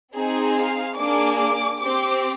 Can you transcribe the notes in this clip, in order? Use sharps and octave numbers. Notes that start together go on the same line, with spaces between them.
C4 D#4 G#4
F5
A#3 D4 G#4 D6
D6
C4 G4 D6